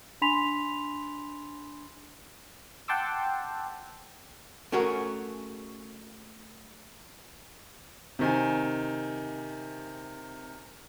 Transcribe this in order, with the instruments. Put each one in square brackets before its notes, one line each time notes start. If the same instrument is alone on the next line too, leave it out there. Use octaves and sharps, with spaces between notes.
[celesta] D4 G#5 B5 C6 B6 F7
[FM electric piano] F#5 G5 A5 C6 D6 E6
[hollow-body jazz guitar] A3 C#4 F#4 G#4 A#4
[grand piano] C3 D#3 G#5